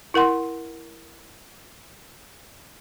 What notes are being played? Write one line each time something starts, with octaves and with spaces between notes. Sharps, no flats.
E4 A#4 F#5 C6